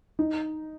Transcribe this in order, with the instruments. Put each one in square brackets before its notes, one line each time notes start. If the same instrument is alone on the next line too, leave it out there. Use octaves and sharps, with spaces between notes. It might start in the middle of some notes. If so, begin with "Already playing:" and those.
[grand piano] D#4